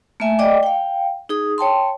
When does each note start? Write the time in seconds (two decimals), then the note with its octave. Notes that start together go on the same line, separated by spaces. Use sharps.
0.20 A3 A#3 E5 G#5
0.39 D5 D#5 G5 D6
0.63 F5 G5
1.29 D#4 G#4 D#6
1.58 C#5 G5 A5 C6